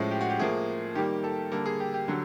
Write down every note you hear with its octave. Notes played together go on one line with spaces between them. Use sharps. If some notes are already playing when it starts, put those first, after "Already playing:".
Already playing: A2 F3 G#3 C#4
G4
F#4
G4
A2 F3 A#3 G#4
D#3 G3 A#3 G4
A4
D3 G3 A#3 A4
G#4
G4
G4
D3 F#3